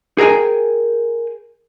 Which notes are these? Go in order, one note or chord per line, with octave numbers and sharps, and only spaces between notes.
G#4 A#4 C#5 G5 G#5